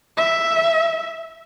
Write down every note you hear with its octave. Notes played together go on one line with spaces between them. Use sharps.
E5